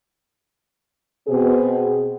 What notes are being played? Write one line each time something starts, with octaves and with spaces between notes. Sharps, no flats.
B2 C4 G#4